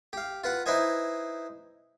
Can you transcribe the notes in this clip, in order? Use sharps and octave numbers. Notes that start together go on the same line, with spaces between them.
G4 F5
F4 B4 F#5
D#4 E4 B4 C5 D#5 G#5